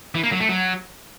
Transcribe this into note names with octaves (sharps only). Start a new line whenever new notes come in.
E3
A#3
F#3
A3
F#3